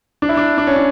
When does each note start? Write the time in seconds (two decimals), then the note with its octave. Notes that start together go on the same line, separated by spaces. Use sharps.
0.22 D4
0.29 E4
0.37 D4
0.58 D4
0.67 C#4
0.76 D4